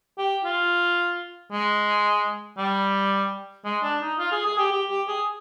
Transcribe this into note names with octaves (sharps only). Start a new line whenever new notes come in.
G4
F4
G#3
G3
G#3
D4
D#4
F4
G#4
G#4
G4
G4
G4
G#4